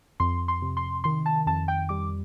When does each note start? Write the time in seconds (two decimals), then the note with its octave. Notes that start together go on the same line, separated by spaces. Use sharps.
0.20 F2 C6
0.48 C6
0.62 C3
0.77 C6
1.04 D#3 C6
1.26 A5
1.46 F2 A5
1.68 G5
1.89 G3 D6